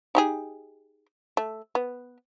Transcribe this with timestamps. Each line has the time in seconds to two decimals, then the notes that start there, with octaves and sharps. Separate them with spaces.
0.15 D#4 G4 G#4
1.37 A3
1.75 B3